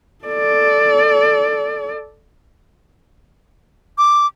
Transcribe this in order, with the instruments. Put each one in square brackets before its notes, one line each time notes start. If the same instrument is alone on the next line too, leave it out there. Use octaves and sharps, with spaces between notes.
[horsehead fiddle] A4 D5
[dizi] D6